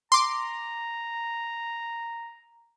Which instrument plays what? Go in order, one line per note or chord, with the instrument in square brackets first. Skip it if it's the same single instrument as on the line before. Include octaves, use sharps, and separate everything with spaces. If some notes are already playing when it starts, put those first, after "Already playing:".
[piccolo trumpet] A#5 [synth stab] C6 D6